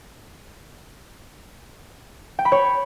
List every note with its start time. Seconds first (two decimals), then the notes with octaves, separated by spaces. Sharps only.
2.39 G5
2.45 B5
2.52 C#5